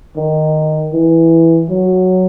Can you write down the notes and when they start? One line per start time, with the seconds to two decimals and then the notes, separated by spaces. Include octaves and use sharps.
0.17 D#3
0.93 E3
1.70 F#3